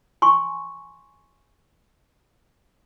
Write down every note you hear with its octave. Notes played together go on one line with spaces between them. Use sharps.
G#5 C6 C#6